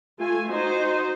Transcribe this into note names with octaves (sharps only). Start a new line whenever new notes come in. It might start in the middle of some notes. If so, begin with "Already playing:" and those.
A3 F4 G#5
D#4 F#4 C5 D#5